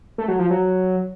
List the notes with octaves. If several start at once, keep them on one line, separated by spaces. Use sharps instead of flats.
A3
F#3
F3
F#3